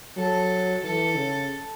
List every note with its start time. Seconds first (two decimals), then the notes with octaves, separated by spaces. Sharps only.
0.16 F#3 A4
0.84 E3 A4
1.16 C#3